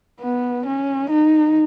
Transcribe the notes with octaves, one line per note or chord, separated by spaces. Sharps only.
B3
C#4
D#4